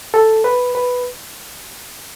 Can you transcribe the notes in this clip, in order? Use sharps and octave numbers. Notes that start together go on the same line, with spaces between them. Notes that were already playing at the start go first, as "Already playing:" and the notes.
A4
B4
B4